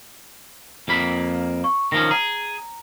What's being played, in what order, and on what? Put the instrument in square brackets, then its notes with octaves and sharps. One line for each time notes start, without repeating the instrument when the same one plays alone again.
[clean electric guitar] F2 A#3 B5
[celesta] C#6
[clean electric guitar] D#3 F3 C#4 [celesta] A#6
[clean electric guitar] G#4 [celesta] A#5